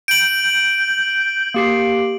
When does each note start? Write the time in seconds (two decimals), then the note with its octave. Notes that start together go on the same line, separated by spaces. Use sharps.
0.08 G6 D7 F#7
1.54 A#3 G4 C7